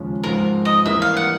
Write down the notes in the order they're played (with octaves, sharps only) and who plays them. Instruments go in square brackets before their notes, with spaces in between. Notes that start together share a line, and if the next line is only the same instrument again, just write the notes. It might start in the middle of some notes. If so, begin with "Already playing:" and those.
Already playing: [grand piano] D#2 C#3 F3 G#3 C#4
[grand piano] G#2 F3 G#3 C4 F4 [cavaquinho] A#4
[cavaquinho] D#5
[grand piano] E3 G3 A#3 D4 [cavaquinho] E5
[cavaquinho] F5
F#5